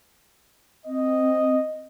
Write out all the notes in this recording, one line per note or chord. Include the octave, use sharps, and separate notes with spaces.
C4 D#5